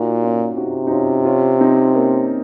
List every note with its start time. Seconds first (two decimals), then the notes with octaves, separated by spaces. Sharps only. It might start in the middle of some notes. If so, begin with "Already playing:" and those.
Already playing: A#2 D#4 F#4
0.23 C#4 F4
0.57 C3 D#4 F#4
0.87 D#4
0.91 C#4 F4
1.25 C#4 F4
1.60 C4 D#4
1.94 A#3 C#4